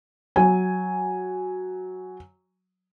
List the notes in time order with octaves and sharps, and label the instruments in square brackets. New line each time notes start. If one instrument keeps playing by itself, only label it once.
[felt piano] F#3 G#5